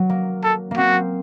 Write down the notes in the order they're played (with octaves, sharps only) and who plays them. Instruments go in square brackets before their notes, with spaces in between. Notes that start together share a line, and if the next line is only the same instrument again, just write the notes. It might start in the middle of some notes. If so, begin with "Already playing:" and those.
Already playing: [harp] F#3
A#3
[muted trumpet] A4
[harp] A#3
[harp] C4 [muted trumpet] F#4